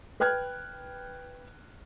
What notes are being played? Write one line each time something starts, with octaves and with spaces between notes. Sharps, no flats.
B4 G5 F6 F#6 G#6